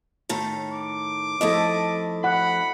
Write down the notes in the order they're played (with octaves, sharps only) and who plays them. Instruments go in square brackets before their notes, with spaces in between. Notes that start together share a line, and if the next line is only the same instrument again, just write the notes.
[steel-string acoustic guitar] A2 D#3 A4
[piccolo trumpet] D6
[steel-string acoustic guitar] F2 A3 E4 [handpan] A4 D#5
[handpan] F#5 [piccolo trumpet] B5